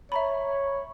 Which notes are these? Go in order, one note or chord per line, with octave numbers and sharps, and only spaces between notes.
C#5 E5 A#5 B5